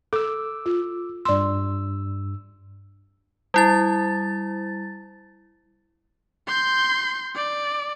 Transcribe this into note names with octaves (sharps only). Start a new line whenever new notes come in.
A4 D6 E6
F4
G2 D5 C6 E6
G3 E4 A6
C6 G6
D5